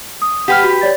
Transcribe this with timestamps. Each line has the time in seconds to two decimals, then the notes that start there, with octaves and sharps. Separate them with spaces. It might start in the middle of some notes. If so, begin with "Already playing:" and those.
0.22 D#6
0.48 G4 B4 F#5 G5 F6
0.63 F#4
0.81 C#5 D5 A6